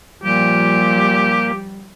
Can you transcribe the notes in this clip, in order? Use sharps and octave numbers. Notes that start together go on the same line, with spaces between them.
A#2 F3 G3 G4